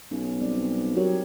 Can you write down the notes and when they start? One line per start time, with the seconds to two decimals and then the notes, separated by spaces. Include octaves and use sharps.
0.11 B1 C#4
0.41 G3 C4 D5
0.97 F#3 G4 A#4 C#5